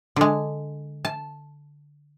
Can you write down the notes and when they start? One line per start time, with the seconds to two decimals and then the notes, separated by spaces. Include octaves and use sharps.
0.16 D3 G#3
1.05 A5